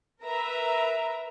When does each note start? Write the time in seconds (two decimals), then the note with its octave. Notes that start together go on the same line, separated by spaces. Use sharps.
0.23 A#4 B4 E5 A#5